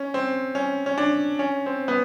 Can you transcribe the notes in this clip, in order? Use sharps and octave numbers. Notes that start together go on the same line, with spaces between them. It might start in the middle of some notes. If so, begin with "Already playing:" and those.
Already playing: C#4
C4
C#4
C#4
D4
C#4
C4
B3